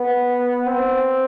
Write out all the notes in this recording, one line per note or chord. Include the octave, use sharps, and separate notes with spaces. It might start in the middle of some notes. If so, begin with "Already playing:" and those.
Already playing: B3
C4